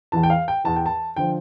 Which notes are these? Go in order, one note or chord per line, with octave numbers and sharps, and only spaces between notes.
E2 E3 A5
G5
F5
G5
E2 E3 A5
G5
A5
D3 F3 G5